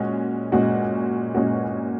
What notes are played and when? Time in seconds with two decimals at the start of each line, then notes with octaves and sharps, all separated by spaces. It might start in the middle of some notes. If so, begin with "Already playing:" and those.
Already playing: A#2 G#3 C#4 F#4
0.52 A#2 G#3 C#4 F#4
1.34 A#2 G#3 C#4 F#4